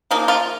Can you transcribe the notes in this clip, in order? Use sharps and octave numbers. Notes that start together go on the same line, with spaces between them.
C#3 F3 A#3 D#4
F4